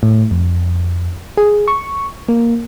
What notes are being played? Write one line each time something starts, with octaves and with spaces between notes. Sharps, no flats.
A2
F2
G#4
C#6
A#3